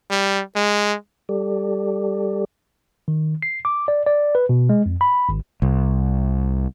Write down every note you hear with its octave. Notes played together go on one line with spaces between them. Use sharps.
G3
G#3
G3 G4 A4 D5
D#3
C7
D6
D5
D5
B4
B2
G#3
F2
B5
G#1
C2